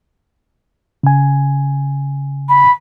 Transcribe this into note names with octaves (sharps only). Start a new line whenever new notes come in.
C#3 G#5
B5